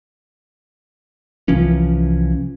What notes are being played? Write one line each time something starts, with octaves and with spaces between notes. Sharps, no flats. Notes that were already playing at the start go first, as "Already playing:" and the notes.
C2 E3 F3 C#4